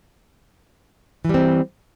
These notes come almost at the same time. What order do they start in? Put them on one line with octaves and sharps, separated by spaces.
E3 G3 C4